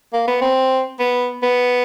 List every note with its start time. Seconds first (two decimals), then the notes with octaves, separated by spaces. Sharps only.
0.13 A#3
0.28 B3
0.42 C4
1.00 B3
1.43 B3